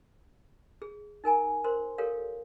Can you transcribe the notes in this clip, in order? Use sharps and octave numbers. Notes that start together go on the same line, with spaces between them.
G#4
D#4 A#4 G#5 A#5
A#4 C5 C6
G4 A4 A#4 C#5 F5